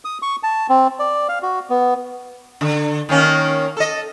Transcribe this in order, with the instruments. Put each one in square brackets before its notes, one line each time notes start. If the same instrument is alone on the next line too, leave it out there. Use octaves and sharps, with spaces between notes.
[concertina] D#6
C#6
A5
C4
D5
F5
F#4
B3
[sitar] D3
D#3 A#3 C#4
A4 D#5